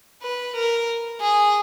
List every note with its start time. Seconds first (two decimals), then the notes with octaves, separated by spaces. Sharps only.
0.22 B4
0.55 A#4
1.20 G#4